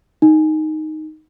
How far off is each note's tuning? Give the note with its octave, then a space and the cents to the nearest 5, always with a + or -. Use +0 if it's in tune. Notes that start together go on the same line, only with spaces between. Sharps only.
D#4 +0